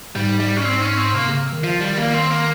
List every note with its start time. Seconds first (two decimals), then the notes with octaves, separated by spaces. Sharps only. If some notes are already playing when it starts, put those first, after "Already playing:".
0.16 G#2 G3
0.40 G3
0.57 C#4
0.65 C4
0.81 C#4
0.97 C4
1.14 C3 A#3
1.27 C#3
1.52 D#3
1.64 F3
1.80 G3
1.98 A#3
2.14 C4
2.31 A#3